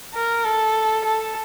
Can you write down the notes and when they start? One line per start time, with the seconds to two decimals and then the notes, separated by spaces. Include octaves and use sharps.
0.15 A#4
0.45 A4
1.05 A4